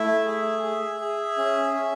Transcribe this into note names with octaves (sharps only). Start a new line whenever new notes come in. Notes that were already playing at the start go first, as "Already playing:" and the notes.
Already playing: A3 E4 E5
G#4
G#4
G#4
C#4
C#4